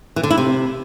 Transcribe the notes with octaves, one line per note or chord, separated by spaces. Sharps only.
E3
D3
E4
C3